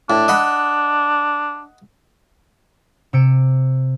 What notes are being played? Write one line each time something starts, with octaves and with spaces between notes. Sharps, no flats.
A2 D4
D#5 F#5 B5
C3 E6 C#7 D7 E7